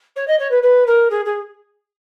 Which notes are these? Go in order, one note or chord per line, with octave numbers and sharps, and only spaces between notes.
C#5
D#5
C#5
B4
B4
A#4
G#4
G#4